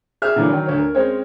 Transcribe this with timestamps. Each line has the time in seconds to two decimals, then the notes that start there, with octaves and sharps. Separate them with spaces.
0.22 G4 G#4 E5 F6
0.36 A#2 D3 E3 F#3
0.49 D#3 F#3
0.66 D2 C#5
0.78 A#4
0.95 G#3 C4 C#4 C5 C#5